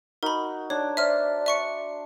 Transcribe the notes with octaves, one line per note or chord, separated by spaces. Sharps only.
D#4 F#4 A#4 B5
D4 C#5
C5 D5 E5 F6
E5 C#6 C#7